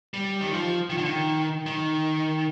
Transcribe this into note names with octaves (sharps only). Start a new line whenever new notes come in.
G3
D#3
F3
D#3
D3
D#3
D#3